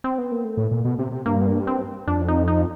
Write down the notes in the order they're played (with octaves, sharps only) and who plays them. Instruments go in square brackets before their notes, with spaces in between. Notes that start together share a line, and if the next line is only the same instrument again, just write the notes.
[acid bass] C4
B3
A#3
A3
[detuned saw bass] A2
A#2
B2
C3
C3
[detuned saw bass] G2 [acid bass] A#3
[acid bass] B3
A#3
C4
[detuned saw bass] F2 [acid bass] D4
[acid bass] D#4
D#4